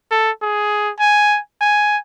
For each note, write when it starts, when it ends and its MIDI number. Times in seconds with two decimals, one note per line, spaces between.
0.11 0.31 69
0.42 0.91 68
1.00 1.39 80
1.61 1.98 80